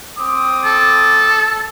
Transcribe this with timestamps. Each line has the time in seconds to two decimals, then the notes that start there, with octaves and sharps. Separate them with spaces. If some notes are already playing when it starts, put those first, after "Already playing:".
0.19 C4 D6 D#6
0.65 A4